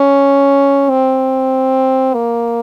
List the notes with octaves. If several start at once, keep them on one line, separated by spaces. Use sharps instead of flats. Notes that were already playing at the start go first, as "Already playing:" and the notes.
Already playing: C#4
C4
A#3